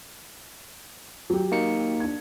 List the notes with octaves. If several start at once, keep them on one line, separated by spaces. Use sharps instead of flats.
F#3 G4
A#3 D#4 C#7
D4 G#6